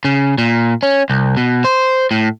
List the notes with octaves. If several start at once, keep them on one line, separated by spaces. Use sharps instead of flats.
C#3
A#2
C#4
C2
B2
C5
A2